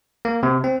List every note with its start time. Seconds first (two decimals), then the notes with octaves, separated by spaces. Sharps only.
0.25 A#3
0.43 C3
0.64 C4